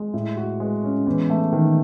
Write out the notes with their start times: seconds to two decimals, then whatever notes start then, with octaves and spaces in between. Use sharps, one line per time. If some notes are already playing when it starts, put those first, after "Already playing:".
Already playing: G#3
0.13 A2
0.37 F#4
0.60 G#3
0.84 C#4
1.07 E2
1.30 A3
1.53 D#3